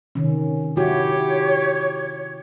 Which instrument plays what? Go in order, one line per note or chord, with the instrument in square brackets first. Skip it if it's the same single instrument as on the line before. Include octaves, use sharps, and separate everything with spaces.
[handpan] C3 D#3 C#4
[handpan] E4 F#4 [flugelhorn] G4 [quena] C#5